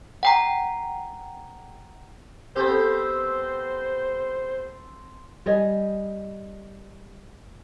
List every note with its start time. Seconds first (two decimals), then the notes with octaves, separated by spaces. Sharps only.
0.23 F#5 G5 A#5
2.56 B3 C4 G4 A4 C5
5.46 G3 D#5 G#5